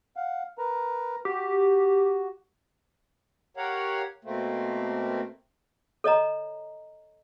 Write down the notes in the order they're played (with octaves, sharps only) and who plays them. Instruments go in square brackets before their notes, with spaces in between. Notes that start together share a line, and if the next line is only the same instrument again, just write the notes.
[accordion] F5 F#5
A#4 B4 A#5
[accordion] F#4 [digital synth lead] G4
[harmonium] G4 A#4 C#5 F5 F#5
B2 A3 A#3 C4
[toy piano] A4 C#5 D#5 A#5